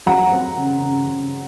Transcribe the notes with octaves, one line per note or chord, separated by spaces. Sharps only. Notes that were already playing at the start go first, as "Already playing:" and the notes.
F#3 F#5 A#5
C4
C#3
C#3
C#3